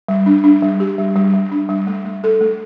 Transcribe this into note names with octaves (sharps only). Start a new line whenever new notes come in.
G3
D4
D4
G3
G4
G3
G3
G3
D4
G3
A3
A3
A4
A3